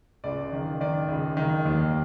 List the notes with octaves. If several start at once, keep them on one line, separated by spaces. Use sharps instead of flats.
C#2 D5
D#3
D#3 D5
C#2
D#3
D#2